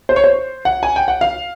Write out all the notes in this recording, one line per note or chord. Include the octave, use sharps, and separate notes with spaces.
C5
C#5
C5
F#5
G#5
G5
F#5
F5